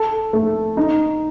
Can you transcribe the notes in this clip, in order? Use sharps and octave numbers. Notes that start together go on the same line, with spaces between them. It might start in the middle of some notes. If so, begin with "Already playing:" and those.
Already playing: A4
A3
D#4